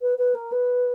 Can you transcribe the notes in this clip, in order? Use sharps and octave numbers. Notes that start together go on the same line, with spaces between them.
B4
B4
A#4
B4